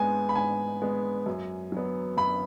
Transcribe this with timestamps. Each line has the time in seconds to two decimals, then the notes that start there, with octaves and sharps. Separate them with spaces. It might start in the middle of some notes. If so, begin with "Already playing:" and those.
Already playing: G#2 G#3 B3 G#5
0.29 B5
0.35 G#2 G#5
0.82 G#3 B3
1.26 F#2
1.72 F#3 B3
2.17 F#2 B5